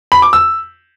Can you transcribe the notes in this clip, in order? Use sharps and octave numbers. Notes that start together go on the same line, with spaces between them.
B5
D6
E6